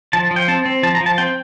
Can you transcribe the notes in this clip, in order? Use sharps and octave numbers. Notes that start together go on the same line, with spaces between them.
F3 A5
F3
G5
C4 A5
C4
F3 A5
A#5
F3
A5
C4 G5